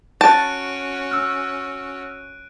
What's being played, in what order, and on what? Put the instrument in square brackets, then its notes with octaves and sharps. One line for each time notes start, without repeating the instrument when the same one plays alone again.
[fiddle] C#4 F#4 [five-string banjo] A5 [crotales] F#6 D7 D#7
[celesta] E6 F6